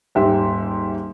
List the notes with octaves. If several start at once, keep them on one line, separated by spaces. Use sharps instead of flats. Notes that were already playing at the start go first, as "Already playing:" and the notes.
D#1 G#2 G4 E5